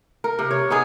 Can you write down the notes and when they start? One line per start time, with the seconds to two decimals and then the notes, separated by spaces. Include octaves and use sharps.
0.24 A#4
0.39 C3
0.51 C#5
0.70 B3 D#4 G#4